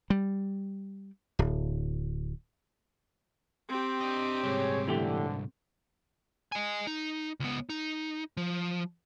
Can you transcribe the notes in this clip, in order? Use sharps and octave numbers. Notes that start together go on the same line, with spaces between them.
G3
D1
C4 G4
D4 D#5
C2 G#2 G#4 C#5
F#2 A2 D3 E3 A3 G4
D#5 G#5
D#4
C#2 B3
D#4
F3